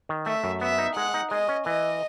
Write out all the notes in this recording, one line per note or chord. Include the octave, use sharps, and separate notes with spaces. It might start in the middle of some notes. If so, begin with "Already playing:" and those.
D#3
A3 E5
F#2
B3 E5
D#4
G#3 F#5
D#4
G#3 D#5
C#4
E3 D#5